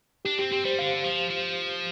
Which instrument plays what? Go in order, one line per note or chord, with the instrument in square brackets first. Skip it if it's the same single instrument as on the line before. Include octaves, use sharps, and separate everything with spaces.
[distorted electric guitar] D4 [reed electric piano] G4
[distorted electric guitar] C4 [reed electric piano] G4
[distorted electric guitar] C4 [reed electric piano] G4
[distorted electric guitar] G3 [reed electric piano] C5
[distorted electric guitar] D3 [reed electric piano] F5
[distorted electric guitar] F3
F3